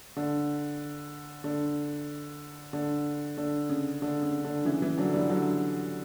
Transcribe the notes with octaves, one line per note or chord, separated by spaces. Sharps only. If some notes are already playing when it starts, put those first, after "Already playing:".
D3
D3
D3
D3
C#3
D3
C#3
D3
C#3 E3
C#3 E3
D3 F#3
E3 G3
D3 F#3